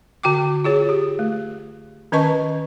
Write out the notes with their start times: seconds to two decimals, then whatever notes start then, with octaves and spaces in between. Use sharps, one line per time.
0.23 D3 F#4 G5 D6
0.64 F4 G#4 C#5
0.89 G4
1.19 A3
2.12 D#3 C#4 B4 D#5 A5 C#6